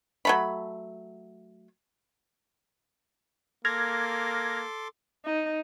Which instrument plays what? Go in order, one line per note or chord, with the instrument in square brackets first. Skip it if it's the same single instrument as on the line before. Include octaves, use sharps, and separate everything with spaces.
[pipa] F#3 A3 B5
[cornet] A#3 [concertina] A4 C6 D6 [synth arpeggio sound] F6 G#6 A#6
[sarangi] D#4